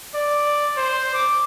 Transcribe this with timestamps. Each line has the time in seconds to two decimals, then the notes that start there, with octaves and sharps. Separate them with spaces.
0.14 D5
0.77 C5
1.14 D6